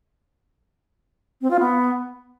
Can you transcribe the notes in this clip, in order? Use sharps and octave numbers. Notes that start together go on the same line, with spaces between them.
C4
F4
B3